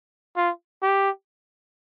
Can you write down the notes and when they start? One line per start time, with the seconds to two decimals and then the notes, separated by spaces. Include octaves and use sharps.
0.36 F4
0.82 G4